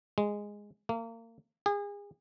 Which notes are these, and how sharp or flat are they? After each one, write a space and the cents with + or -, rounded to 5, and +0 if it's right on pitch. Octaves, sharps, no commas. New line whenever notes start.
G#3 -10
A#3 -30
G#4 -35